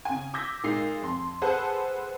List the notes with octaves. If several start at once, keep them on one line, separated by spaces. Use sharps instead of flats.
C#3 G#5
D6 E6 G6 G#6 A#6 B6
A#2 G#3 D#4 C7
F2 C6
G#4 A4 B4 C5 F#5 A5